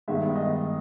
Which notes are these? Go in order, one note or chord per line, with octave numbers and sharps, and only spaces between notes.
G2 D#3 G#3 B3 E5
D#5